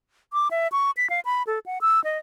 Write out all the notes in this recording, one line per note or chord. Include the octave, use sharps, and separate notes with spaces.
D6
E5
C#6
B6
F5
B5
A4
F#5
E6
D#5